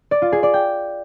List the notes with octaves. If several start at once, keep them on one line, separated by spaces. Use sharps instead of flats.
D5
F4
G#4
D5
G5